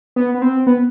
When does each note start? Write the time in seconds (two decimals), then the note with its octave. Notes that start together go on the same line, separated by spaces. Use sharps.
0.16 B3
0.34 B3
0.42 C4
0.67 B3